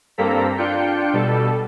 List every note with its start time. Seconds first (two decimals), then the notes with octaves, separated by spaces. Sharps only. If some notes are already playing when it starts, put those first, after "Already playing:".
0.18 G2 A#3 C4 A4 A#5 B6
0.57 D4 F4 G5 G6 C#7
1.13 B2 G3 A4